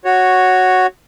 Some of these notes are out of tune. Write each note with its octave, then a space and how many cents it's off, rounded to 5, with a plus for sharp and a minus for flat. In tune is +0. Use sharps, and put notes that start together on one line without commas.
F#4 +0 C#5 -5